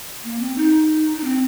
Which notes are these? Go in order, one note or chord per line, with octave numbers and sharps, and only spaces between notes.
A#3
C4
D#4
D#4
C4